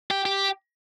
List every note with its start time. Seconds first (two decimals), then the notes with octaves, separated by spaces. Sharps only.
0.11 G4
0.25 G4